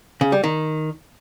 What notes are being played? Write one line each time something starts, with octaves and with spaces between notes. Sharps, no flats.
C#3
G3
D#3